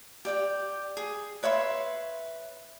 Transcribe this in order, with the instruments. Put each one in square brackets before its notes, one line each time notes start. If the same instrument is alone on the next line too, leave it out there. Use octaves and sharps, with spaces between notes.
[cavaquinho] G4 D5 G5
G#4
B4 C#5 E5 C6